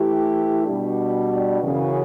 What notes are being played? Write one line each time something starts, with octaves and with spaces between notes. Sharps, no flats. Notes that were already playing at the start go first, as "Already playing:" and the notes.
Already playing: E3 A3 E4 G4
B2 G3 D4
F#2 C#3 E3